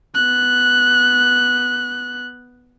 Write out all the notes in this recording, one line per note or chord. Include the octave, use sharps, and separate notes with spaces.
B3 F#6